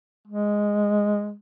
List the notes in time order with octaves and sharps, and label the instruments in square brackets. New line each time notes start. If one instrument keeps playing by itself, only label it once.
[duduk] G#3